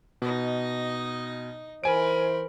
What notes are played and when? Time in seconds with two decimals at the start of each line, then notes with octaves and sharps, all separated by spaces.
0.22 B2 D#4 D#5
1.84 E3 A#4 C5 G#5 B5 D7